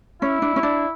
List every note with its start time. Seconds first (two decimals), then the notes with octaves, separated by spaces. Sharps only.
0.22 C#4 E4
0.42 D4
0.56 C#4
0.63 D4